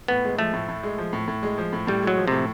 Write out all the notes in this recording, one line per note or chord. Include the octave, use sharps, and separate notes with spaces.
A2 B3
G#3
F3 A3
A2
A2
G#3
F3
A2
A2
G#3
F3
A2
A2 G3
F#3 G#3
F3
A2 C3